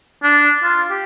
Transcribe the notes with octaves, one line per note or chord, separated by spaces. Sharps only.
D4
F4
G4